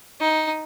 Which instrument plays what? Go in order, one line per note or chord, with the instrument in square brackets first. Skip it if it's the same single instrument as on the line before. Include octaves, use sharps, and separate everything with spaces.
[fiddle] D#4